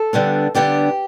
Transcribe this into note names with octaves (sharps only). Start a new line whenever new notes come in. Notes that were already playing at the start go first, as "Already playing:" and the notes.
Already playing: A4
D3 G3 B3 D4
D3 G3 B3 D4 G4